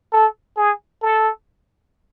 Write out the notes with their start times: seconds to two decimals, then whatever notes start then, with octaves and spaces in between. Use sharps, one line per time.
0.13 A4
0.57 G#4
1.02 A4